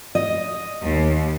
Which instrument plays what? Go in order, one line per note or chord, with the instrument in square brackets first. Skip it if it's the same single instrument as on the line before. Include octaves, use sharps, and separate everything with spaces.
[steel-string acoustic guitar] D#5
[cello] D#2